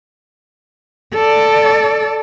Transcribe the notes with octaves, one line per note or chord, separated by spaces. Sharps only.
A4 D5